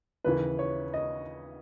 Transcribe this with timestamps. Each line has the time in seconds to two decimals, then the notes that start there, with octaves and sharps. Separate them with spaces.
0.24 D#2 C#3 E3 B4
0.59 C#5
0.94 D#5